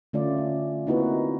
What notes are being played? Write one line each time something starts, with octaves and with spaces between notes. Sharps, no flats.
D3 A3 C#4 F4 D5
C#4
A#3 C4 D#4 E4 F#4 B4